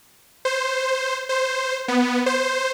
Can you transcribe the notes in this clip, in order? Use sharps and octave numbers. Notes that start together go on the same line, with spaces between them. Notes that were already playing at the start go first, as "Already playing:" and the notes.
C5
C5
B3
C5